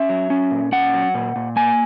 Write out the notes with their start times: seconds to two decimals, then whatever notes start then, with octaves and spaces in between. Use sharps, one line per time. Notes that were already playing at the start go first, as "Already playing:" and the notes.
Already playing: C#4 E5
0.09 F#3
0.30 C#4
0.51 A#2
0.72 C#4 F#5
0.94 F#3
1.14 A#2
1.36 A#2
1.56 A#3 G#5